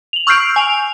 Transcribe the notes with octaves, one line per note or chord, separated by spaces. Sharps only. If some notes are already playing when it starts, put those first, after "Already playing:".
F7 F#7
C#6 E6 F6 G6 C7 D7
G#5 F7